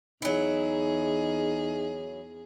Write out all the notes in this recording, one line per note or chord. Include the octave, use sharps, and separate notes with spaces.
E2 F#3 D#4 E4 G#4